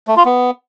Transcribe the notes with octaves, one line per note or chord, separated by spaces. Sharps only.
A3
F4
B3